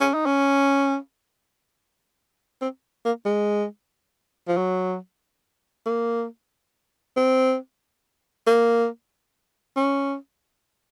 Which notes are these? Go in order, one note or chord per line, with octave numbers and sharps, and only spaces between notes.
C#4
D#4
C#4
C4
A#3
G#3
F3
F#3
A#3
C4
A#3
C#4